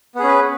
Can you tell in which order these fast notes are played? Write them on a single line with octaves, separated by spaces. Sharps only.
B3 G#4 C#4 B4